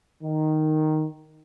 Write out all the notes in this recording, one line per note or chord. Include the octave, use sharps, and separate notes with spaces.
D#3